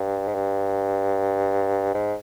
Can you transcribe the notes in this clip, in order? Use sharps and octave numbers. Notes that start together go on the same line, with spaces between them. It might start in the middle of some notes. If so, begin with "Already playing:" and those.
Already playing: G2
G#2
G2
G#2